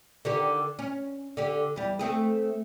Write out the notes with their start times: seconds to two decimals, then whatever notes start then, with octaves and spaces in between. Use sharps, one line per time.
0.25 D3 D#3 G4
0.79 C#4
1.37 D3 G4
1.76 E2 G3
1.99 A3 C4 G#4